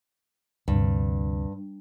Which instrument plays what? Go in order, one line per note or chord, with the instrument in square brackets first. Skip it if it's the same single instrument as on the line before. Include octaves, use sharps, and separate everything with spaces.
[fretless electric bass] D2 C3 [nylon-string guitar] G2